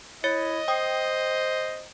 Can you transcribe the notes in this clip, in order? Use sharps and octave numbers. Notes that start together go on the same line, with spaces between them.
E4 C#5 D#5 A6 C#7
C5 G5 D#6